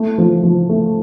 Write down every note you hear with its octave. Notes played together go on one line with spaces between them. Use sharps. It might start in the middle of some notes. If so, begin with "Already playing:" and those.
Already playing: A3 E4
F3
F3
A3